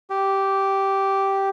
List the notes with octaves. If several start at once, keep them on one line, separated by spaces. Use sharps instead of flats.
G4